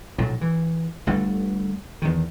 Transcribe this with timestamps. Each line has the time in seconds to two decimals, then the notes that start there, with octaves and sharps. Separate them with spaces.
0.18 B1 A#2 F#3
0.41 E3
1.07 G1 G2 D3 A3
2.02 E2 D#3